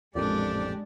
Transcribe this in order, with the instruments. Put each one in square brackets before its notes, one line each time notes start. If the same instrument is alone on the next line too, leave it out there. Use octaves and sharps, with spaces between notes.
[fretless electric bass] A1 F2 A#2 [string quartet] G#3 D4 [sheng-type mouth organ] G4 D5